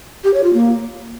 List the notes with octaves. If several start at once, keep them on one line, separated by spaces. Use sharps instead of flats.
G4
C#5
F4
A#3